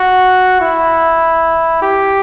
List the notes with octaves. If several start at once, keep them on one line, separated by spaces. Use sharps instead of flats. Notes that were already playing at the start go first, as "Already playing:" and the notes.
Already playing: F#4
E4
G4